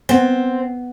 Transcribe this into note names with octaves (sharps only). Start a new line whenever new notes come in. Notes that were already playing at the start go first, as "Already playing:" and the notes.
B3 C4